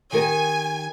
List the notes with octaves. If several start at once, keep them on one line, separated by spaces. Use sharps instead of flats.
D#3 G4 A#4 G#5